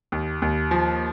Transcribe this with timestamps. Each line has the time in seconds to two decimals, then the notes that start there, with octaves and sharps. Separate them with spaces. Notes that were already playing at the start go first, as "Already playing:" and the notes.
0.12 D#2
0.42 D#2
0.71 F3